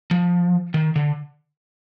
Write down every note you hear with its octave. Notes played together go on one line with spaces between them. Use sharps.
F3
D#3
D3